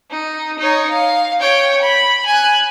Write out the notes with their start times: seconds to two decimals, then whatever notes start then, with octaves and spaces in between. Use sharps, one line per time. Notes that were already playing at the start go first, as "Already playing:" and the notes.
0.11 D#4
0.58 D#4 C#5
0.90 F5
1.40 C#5 G5
1.81 B5
2.26 G#5 F#6